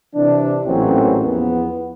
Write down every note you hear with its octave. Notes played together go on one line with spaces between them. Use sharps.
C3 E3 D4
A1 A#2 E3 F#3 C4 C#4
E2 F3 B3